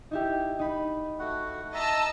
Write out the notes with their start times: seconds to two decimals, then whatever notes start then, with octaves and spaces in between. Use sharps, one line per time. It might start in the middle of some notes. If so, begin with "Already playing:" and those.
0.11 D#4 E4 G4
0.59 D#4 B5
1.19 A3 F#4 F#5
1.74 D#5 E5 A5 A#5 E6